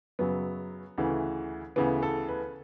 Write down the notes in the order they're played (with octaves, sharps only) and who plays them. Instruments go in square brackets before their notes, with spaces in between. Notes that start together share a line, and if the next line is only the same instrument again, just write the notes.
[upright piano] F#2 C#3 F#3 B3
D2 C#3 E3
D2 C#3 E3 B3
A4
B4